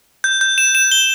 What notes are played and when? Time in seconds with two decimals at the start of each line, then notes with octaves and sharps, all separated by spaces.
0.24 G6
0.41 G6
0.58 E7
0.75 E7
0.92 G7